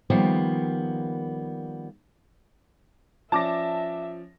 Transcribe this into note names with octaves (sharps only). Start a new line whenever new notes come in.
D#3 F3 G3 A#3 B3
F3 C#4 D5 E5 A5 D6 A#6